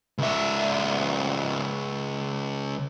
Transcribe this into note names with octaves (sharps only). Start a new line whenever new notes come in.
C#2 E5